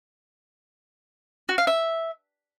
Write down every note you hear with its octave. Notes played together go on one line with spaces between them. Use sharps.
F#4
F5
E5